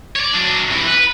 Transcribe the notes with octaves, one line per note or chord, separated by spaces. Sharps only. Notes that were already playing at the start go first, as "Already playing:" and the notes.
C#5 D5
F#3 D4
C3 E3
B4